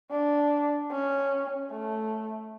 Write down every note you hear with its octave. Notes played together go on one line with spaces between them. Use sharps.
D4
C#4
A3